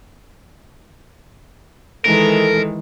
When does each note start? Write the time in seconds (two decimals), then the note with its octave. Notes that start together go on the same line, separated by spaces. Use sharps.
2.05 D#3 E3 G#3 A4 A#4